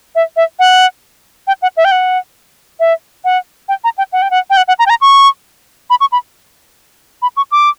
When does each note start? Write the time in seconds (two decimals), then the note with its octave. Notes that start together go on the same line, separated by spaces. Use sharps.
0.15 E5
0.36 E5
0.59 F#5
1.47 G5
1.62 F#5
1.77 E5
1.85 G5
1.91 F#5
2.80 E5
3.25 F#5
3.69 G5
3.84 A#5
3.98 G5
4.13 F#5
4.22 G5
4.31 F#5
4.50 G5
4.57 F#5
4.68 F#5
4.79 A#5
4.86 G5
4.90 A#5
5.01 C#6
5.90 B5
6.00 C#6
6.12 B5
7.22 B5
7.37 C#6
7.52 D6